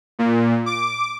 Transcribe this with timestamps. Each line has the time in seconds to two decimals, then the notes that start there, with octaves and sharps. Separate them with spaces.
0.19 A#2
0.66 D6